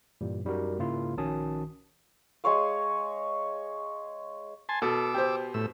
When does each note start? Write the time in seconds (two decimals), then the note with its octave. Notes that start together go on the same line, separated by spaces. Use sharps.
0.21 G2 A#2 E3 G3
0.45 F#2 G3 D#4 F#4 A#4
0.78 G#2 C#3 A#3 E4 F4
1.17 A#1 D#3 C#4 F#4 A5 D#6
2.44 G#3 G#4 C#5 F5
4.69 G#5 A5 C6
4.82 B2 A4 D6 E6
5.14 G4 C5
5.54 A2 E6